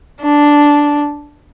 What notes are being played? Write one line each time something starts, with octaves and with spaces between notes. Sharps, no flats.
D4